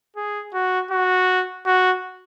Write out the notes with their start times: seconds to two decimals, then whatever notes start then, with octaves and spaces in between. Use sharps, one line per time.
0.16 G#4
0.54 F#4
0.91 F#4
1.66 F#4